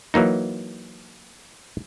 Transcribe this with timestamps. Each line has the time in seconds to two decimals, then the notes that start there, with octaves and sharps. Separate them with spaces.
0.14 E3 F#3 A#3 D#4